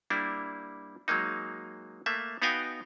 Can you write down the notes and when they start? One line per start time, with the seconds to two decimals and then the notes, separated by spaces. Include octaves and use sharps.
0.10 G3 A#3 D4 E4
1.08 F#3 G#3 A#3 D#4
2.06 A3 A#3 E5
2.42 B3 D#4 F#4 F5 G5 G#5